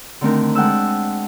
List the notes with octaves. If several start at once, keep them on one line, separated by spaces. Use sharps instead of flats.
D3 D#3 A3 C4 D4 A#4
G#3 F#5 G5 A5 E6